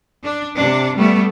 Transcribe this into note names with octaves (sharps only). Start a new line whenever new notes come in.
D4
C3 D4
G3 A3 B3